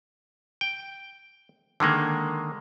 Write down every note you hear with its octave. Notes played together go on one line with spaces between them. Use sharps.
G5
D3 D#3 G#3 A#3